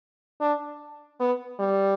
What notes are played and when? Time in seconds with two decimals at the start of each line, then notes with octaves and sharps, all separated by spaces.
0.41 D4
1.20 B3
1.59 G3